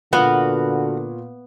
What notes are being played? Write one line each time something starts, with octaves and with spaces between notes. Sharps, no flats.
A#2 D3 A#3 B3 F4 F#4 B4 F5